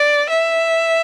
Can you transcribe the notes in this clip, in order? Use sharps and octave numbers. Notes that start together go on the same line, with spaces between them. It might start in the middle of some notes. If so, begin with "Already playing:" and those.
Already playing: D5
E5